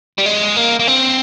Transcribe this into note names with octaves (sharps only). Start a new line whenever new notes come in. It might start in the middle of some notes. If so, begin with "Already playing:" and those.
G3
G#3
A#3
A#3
C4